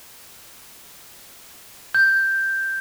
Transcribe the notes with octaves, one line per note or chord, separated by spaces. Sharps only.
G6